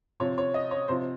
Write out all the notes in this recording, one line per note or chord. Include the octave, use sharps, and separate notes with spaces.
C3 F3 C#5
C#5
D#5
C#5
C3 F3 C5